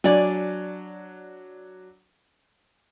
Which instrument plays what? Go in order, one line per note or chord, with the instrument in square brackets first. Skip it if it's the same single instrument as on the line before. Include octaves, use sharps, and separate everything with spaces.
[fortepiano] F#3 D4 [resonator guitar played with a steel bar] D5 G#5